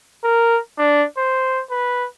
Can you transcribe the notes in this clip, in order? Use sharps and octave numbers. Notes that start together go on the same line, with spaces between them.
A#4
D4
C5
B4